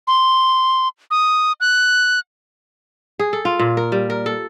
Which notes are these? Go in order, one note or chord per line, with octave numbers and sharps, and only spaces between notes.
C6
D#6
F#6
G#4
A4
F4
A#2
A#4
G3
A#4
A4